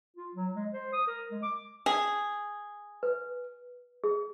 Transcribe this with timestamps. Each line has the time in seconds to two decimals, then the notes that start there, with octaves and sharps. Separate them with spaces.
0.17 F4
0.35 F#3
0.55 G#3
0.73 C5
0.93 D#6
1.07 A#4
1.31 G#3
1.43 D6
1.86 G#4
3.03 B4
4.04 G#4